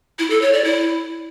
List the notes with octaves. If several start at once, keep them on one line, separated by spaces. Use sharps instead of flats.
E4
A4
C#5
D5
E4